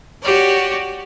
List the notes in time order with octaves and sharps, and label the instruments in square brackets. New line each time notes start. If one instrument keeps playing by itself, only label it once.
[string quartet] F#4 G4 C#5 D5